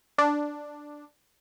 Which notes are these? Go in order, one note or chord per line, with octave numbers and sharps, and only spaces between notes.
D4